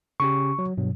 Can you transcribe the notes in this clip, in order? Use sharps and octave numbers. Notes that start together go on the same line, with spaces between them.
C#3 C#4 G4 C#6
F#3
G2 B2 F#3